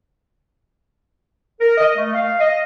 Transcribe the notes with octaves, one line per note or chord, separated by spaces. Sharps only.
A#4
D#5
A3
F5
D#5